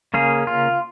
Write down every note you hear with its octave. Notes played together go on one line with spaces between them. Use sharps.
C#3 A#3 C#4 G#4
F4